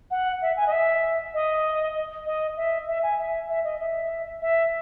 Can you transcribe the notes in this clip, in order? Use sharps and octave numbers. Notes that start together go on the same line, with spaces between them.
F#5
E5
G#5
D#5
E5
D#5
D#5
E5
E5
G#5
E5
E5
D#5
E5
E5